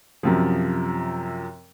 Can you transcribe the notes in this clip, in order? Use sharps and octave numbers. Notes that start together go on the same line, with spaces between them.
F#2 C3 F3